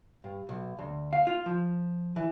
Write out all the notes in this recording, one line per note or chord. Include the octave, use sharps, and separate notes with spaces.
G2
B1
D2
F5
F4
F3
E3